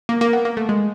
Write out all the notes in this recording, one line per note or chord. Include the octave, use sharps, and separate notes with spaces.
A#3
A#3
B3
A#3
A3
G#3